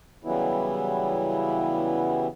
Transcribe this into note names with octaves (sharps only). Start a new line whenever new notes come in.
C#3 E3 F#3 G3 B3 E4